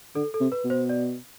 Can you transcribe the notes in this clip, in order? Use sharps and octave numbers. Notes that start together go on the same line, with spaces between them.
D3 A4
A4
C3
B4
B2
C5
D5